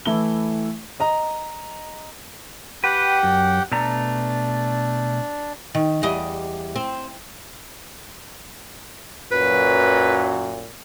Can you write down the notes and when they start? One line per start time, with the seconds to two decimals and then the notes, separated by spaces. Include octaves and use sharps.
0.06 E3 A3 E4 G7
1.00 D#5 A#5
2.84 G4 B4 F#5 G5
3.23 F#2
3.72 B2 A3 D4 A#5
5.75 D#3
6.03 E2 G3 D#5
6.76 C4
9.32 F#2 A#2 F#3 B4